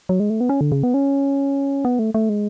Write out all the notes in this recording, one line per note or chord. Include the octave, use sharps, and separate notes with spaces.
F#3
G#3
A3
B3
C#4
D3
C#3
B3
C#4
B3
A3
A3
G#3